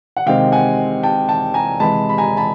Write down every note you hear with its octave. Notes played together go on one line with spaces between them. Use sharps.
F#5
C3 D#3 G#3 C4 F5 G5
F#5 G#5
G5 A5
G5 A5
G#5 A#5
C3 E3 G#3 A5 B5
B5
G#5 A#5
A5 B5